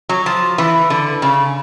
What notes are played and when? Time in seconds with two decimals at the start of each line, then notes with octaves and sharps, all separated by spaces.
0.09 F#3
0.26 F3
0.58 E3
0.90 D3
1.22 C#3